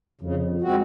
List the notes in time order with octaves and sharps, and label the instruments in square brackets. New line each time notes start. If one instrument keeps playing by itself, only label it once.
[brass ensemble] F2 [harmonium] C#3
[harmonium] G#3 C4 F#4